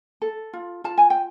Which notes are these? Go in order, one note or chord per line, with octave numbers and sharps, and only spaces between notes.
A4
F4
F4 A5
G#5
G5